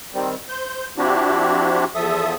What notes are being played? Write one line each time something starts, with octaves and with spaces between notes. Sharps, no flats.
D#3 G3 C4
C5 G6
F3 C4 D4 E4 F#4 G4
E2 F3 A4 E5 D#6